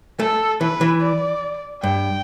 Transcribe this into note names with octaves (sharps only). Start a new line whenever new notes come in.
A3 A4
E3 B4
E3
D5
G2 G5